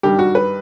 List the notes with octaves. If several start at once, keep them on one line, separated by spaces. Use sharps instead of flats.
G2 D#3 G3 G4
F#4
B4